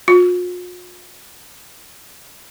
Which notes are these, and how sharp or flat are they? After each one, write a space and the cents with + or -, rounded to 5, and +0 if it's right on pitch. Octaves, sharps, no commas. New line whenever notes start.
F4 +45